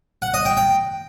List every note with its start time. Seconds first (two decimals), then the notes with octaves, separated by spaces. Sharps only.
0.22 F#5
0.34 D#5
0.45 G5
0.57 G5